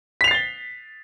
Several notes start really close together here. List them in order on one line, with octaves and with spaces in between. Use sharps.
B6 F7 C7 A6 G7